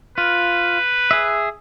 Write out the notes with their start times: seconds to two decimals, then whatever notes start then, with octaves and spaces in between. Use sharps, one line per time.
0.18 F4 B4
1.11 G#4 E5